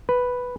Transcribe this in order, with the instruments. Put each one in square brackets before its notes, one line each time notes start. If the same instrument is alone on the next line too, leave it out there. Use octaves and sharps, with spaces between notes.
[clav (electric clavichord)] B4